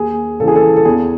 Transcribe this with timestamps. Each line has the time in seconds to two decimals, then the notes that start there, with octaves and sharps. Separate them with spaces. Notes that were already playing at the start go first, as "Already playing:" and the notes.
Already playing: D#2 G#4
0.40 C#3 E3 A4
0.48 G#4
0.55 A4
0.77 A4
0.85 E2 G#4